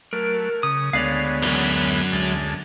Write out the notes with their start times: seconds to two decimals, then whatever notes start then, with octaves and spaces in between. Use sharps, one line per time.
0.13 F#3 A3 A#4
0.63 C#3 D#6
0.93 D2 G#3 B3 C#5 D5 F5
1.43 B1 F#2
2.12 D2 G#3 A5